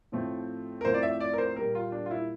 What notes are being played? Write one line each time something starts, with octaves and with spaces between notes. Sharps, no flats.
A2 F3 A3 C4
A#4
A2 F3 A3 C4 C5
D5
E5
D5
A#4
C5
A#2 G3 A#3 A#4
F4
D4
F4
E4